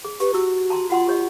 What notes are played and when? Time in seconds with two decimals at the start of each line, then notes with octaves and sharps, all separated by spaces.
0.04 G#4
0.20 G4 B4
0.34 E4 F#4 E6
0.70 A5 A#5 C6
0.90 F4 F#4 F#5 C6
1.07 G4 C#5 D#5